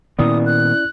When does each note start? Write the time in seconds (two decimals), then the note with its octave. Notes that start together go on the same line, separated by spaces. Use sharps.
0.19 A#2 D#3 B3 C#4 E4 D5 D#6
0.46 F#6